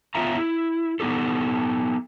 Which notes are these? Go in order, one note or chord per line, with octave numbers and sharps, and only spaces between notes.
B3 F4 C#5 E5 F5 A#5
E4
B3 D#4 G4 A4